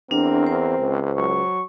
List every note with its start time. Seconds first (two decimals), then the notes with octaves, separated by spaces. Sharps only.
0.11 E2 C4 D4 A#4
0.47 C5
0.79 C#2
1.17 F#3 C#6